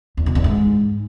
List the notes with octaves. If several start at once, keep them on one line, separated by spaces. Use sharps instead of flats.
E2
B2
E2
G#2